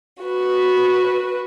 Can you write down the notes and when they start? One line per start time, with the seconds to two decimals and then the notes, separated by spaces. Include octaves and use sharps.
0.23 F#4 B4